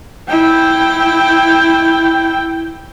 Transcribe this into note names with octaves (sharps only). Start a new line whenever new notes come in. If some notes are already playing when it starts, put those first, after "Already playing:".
E4 G5